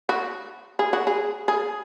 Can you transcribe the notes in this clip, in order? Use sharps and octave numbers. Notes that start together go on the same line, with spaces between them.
F#4
G#4
F#4
G#4
G#4